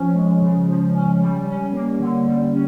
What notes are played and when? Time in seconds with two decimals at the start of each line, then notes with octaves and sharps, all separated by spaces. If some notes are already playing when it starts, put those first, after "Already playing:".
Already playing: F3 C#4
0.15 G#3
0.41 C#3
0.68 F3
0.94 C#4
1.20 G3
1.46 C#4
1.73 A#3
1.99 D3
2.26 G3
2.52 C#4